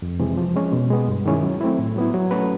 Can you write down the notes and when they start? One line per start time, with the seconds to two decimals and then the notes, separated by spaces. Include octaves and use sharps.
0.02 F2
0.20 C3 E3 G#3
0.37 F3
0.56 G#3 C#4
0.72 B2
0.90 G#3 B3
1.08 G2
1.26 D#3 G#3 C#4 E4
1.43 F#3
1.61 A3 C4 E4
1.79 A2
1.96 F#3 B3 E4
2.14 F#3
2.31 A3 C#4 F#4 B4